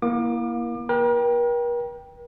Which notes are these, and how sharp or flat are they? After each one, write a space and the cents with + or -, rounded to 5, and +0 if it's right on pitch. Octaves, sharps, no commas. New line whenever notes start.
A#3 +25 E4 +0 D6 +35
A#4 +45 G5 +0